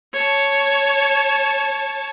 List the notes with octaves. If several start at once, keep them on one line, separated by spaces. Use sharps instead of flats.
C#5 A5